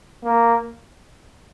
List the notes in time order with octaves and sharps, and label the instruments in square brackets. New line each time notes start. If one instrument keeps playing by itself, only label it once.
[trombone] A#3